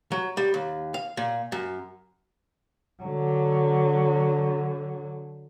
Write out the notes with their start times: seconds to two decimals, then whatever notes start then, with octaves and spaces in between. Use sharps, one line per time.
0.12 F#3
0.37 G3
0.54 D#2
0.94 F5
1.17 A#2
1.52 F#2
3.02 D3 F#3